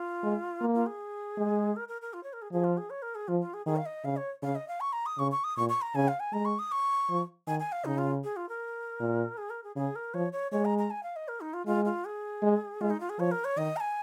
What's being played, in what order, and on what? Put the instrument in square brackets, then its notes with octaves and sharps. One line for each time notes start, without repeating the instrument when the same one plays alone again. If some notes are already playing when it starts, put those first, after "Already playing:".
Already playing: [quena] F4
[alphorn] G#3
A#3
[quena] F4
G#4
[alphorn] G#3
[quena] A#4
A#4
A#4
F4
C#5
A#4
G#4
[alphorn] F3 [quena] G#4
[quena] F4
G#4
C#5
A#4
G#4
[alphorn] F3 [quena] F4
[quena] F4
G#4
[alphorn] D#3 [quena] G#4
[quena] F5
D#5
[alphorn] C#3 [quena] F5
[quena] C#5
[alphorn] C#3 [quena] F5
[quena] D#5
F5
C#6
A#5
D#6
[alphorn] C#3 [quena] C#6
[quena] C#6
D#6
[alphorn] A#2 [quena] C#6
[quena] C#6
A#5
[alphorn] C#3 [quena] G#5
[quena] F5
G#5
[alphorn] G#3 [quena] A#5
[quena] C#6
D#6
C#6
[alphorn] F3
[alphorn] D#3 [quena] G#5
[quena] G#5
F5
[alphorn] C#3 [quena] D#4
[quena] F4
G#4
F4
A#4
[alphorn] A#2
[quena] G#4
A#4
G#4
[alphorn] C#3 [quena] G#4
[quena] A#4
[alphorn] F3 [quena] C#5
[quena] C#5
[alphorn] G#3 [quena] C#5
[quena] A#5
A#5
G#5
F5
D#5
A#4
D#4
F4
[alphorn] G#3 [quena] F4
[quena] F4
G#4
[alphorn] G#3
[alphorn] G#3 [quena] F4
[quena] D#4
F4
G#4
[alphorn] F3 [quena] C#5
[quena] A#4
C#5
[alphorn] D#3 [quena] D#5
[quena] A#5
G#5